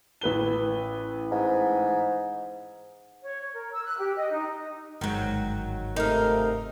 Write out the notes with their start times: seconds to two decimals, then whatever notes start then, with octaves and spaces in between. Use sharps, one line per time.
0.21 A1 B4 G7
1.31 G#2
3.23 C#5
3.42 C#5
3.54 A#4
3.72 E6
3.84 F#6
3.98 G4
4.17 D#5
4.31 D#4
5.01 G1 G#2 D#3 F#3
5.96 C3 A3 D#4 A#4 F5